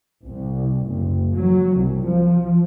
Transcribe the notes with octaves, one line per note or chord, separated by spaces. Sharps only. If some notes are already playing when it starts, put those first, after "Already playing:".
C2
F#1
F#3
C2
F3